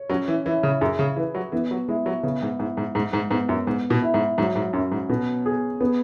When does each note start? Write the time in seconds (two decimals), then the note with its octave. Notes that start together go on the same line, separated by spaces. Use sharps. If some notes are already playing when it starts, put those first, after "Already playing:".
Already playing: C#5
0.10 F#3 C#4
0.28 E3
0.45 E3 E4
0.63 C#3
0.81 F#2 G#4
0.99 C#3
1.16 E3 B4
1.35 F#3
1.52 E3 B3
1.71 F#3
1.88 G#3 E4
2.06 F#3
2.23 C#3 B3
2.42 G#2
2.59 G#2 E4
2.77 G#2
2.95 G#2 G#3
3.13 G#2
3.31 G#2 B3
3.49 F#2
3.67 G#2 B3
3.90 B2
4.02 E4
4.14 G#2
4.38 G#2 F#3
4.55 G#2
4.73 F#2 C#4
4.92 G#2
5.09 B2 B3
5.46 G#4
5.81 B3